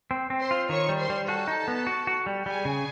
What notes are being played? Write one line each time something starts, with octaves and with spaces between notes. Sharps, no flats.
C4
C4
C5 C6
F4
D#3 C#5 C#6
G3
C5 C6
G3
F#4 A4 A5
D#4
B3
F#4
F#4
G3
G3 G#4 G#5
C#3